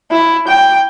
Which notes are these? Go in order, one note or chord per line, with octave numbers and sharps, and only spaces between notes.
E4
G5